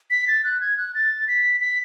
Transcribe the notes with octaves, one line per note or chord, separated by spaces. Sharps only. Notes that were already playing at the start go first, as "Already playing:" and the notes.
B6
A6
F#6
G#6
F#6
A6
B6
B6